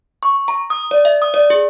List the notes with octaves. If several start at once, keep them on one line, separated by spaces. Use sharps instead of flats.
C#6
A#5
D#6
D5
E5
D#6
D5
G#4